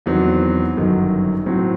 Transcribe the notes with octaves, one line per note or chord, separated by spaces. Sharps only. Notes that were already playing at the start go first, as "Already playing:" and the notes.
E2 D#3 F#3 C4
G1 F#2 D#3 F#3
A2 F#3 C4